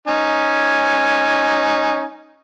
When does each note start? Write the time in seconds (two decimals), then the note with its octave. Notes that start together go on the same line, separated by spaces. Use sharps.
0.08 C#4 D#4 G#5